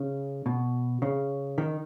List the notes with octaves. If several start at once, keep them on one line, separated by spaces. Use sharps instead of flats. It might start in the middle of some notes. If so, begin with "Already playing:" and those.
Already playing: C#3
B2
C#3
D#3